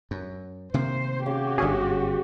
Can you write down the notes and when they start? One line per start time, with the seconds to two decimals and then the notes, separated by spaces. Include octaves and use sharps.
0.11 F#2
0.74 C3 D#3 A#3 C5
1.26 C#3 F#4 G4
1.58 G1 G#2 D3 C#4 G#4